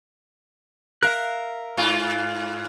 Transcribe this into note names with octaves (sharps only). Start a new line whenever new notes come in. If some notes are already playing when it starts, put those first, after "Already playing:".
A#4 E5 F5 F#6
G#2 F4